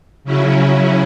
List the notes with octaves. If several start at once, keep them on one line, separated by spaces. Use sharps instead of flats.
C#3 F#3 C#4 E4